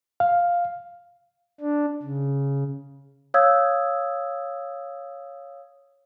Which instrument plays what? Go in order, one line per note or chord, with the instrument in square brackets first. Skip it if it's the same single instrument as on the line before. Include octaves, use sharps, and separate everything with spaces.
[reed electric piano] F5
[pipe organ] D4
C#3
[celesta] C#5 F5 D#6 E6 G#6